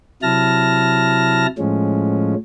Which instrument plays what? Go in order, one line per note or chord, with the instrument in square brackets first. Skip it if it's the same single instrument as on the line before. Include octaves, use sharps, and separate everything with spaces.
[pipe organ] C3 F#3 E4 A5 F6 A#6
A2 F3 G#3 C#4